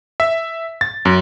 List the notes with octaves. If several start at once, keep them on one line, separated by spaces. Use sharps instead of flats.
E5
A6
F#2